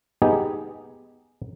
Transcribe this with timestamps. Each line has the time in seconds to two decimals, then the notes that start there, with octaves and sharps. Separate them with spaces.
0.22 B3 D#4 G4 G#4